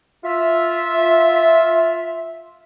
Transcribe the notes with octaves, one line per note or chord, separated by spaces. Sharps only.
F4 E5